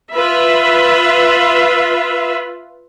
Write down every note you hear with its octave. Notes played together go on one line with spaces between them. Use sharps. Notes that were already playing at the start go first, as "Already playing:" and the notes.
F4 B4 E5